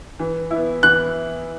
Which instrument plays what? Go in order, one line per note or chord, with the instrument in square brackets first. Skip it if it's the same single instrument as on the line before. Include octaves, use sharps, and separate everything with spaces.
[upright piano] E3
E4
B3
[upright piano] E3 [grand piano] F#6